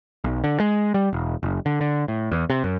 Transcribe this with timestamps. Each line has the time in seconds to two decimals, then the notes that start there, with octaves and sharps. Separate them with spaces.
0.24 B1
0.44 D3
0.60 G#3
0.94 G3
1.13 E1
1.43 F#1
1.66 D3
1.81 D3
2.08 A2
2.32 E2
2.50 C3
2.64 F#2